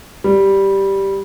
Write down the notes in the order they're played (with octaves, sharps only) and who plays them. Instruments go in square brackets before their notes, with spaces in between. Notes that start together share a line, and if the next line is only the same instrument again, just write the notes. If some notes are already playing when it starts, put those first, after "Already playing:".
[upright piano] G3